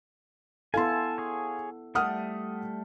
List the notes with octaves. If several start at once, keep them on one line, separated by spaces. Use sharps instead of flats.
B3 E4 A4 F5 G#5 A5 C6
G#4 C#5
G3 A3 F#5 D#6 F6